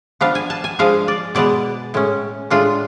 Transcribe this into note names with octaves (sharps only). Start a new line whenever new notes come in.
F3 B3 D4 F5
G#5
A5
G#5
F3 G#3 D4 F5
D5
B2 G#3 B3 D5
A2 G#3 C#4
A2 G#3 D4 F4